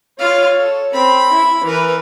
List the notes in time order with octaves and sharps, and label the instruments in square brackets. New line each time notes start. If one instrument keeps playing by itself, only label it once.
[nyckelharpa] F4 F5 [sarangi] C#5
[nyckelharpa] A4
[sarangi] C4 [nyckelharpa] B5
[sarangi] E4
[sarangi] E3 [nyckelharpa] A#4 B4